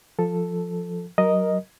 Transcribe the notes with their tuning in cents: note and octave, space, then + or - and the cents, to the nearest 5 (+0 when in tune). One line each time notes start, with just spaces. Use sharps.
F3 +0 A4 +0
F#3 +15 A#4 +5 D#5 +0